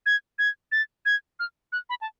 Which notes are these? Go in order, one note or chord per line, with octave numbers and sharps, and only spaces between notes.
G#6
G#6
A6
G#6
F6
F#6
B5
A5